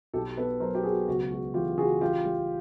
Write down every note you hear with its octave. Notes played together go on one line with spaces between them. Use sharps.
B1 G4 A4
B3 A4 B4
F#3 A#4 C5
G4
B2 F#4 G#4
C#2 F#4
G#3 F#4
E3 F4 G4
C#3 F#4 G#4
A1 F4 G4
G3